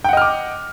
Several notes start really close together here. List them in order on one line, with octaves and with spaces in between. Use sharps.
G5 F#5 D#5 F6 D6